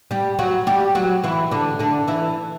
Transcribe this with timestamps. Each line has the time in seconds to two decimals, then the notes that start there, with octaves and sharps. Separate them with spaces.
0.11 G3 G4
0.39 F#3 F#4
0.67 G3 G4
0.95 F#3 F#4
1.23 E3 E4
1.51 D3 D4
1.79 D3 D4
2.07 E3 E4